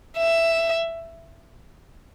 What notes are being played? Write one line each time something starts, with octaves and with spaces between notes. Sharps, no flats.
E5